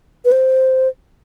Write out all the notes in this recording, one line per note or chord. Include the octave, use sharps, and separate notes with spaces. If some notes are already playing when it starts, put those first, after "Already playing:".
B4
C5